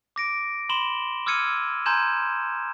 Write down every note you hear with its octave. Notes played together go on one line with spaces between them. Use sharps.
D6 A#6 D7
B5 C6 E7 F#7 G7
D6 E6 F6 G#6 C#7 D#7
G#5 A#5 C6 G6 G#6 E7